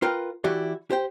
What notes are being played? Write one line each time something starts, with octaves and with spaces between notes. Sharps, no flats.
F4 A#4 B4 G5
E3 E4 F#4 G4 D5
G4 C5 G5